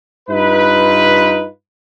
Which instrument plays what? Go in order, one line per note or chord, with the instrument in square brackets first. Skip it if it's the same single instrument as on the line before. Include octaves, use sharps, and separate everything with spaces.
[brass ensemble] G2 D#4 F4 B4